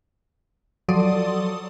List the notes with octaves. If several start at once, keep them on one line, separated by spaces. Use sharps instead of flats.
F3 F#3 A4 D5 C6 D#6